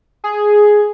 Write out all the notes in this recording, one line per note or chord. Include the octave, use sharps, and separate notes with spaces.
G#4